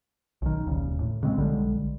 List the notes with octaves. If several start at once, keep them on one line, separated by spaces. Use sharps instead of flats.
B1 D#3
E1 D#2 C#3
A2
C#3 G#3 B3 C4
B1 D3 G3 G#3